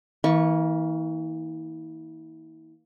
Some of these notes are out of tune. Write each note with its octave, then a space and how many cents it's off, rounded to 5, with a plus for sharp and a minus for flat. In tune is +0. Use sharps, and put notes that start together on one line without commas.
E3 -40 A#3 +0 C#6 +0